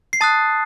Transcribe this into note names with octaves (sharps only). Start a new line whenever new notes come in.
C7
A5 D#6 F#6 A6